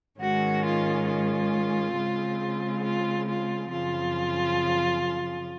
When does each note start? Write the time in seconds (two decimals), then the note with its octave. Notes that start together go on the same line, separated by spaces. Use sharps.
0.20 G#2 D#3 G#3 C#4 F#4
0.64 F4
1.08 F4
1.95 C#3 G#3 C4
2.83 F4
3.27 F4
3.71 F#2 C#3 F3 C4 F4